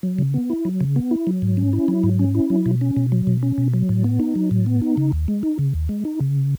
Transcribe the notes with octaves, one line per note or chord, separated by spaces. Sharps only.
F#3
C#3
B3
E4
F#3
C#3
B3
E4
F#3
G#2
C#4
E4
F#3
G#2
C#4
E4
F#3
B2
C#4
B2
F#3
B2
C#4
B2
F#3
A2
B3
D#4
F#3
A2
B3
D#4
C#3
D#2
G#3
D#4
C#3
D#2
G#3
D#4
C#3